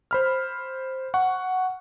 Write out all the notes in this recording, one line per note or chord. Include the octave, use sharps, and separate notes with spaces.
C5 B5 F6
F#5 C#6